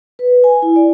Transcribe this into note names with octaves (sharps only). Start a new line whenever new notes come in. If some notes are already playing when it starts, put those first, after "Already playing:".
B4
G#5
E4
D5